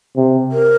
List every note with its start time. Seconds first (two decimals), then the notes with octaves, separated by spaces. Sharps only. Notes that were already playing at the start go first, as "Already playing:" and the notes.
0.17 C3
0.52 A#4